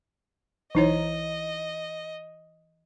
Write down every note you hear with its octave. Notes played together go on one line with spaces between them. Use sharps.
B1 E3 D#4 E4 C#5 D#5 A#5